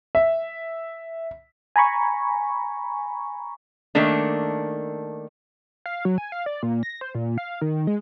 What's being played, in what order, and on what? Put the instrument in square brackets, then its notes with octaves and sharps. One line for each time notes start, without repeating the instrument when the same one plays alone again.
[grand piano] E5
[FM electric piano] G#5 A#5 B5 C#6
[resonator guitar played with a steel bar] D#3 A3 A#3 D4
[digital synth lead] F5
F#3
G#5
F5
D5
A#2
A#6
C5
A#2
F5
D#3
G#3